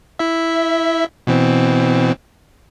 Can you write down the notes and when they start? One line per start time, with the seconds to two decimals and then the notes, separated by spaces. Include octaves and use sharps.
0.19 E4 E5
1.27 B2 E3 C4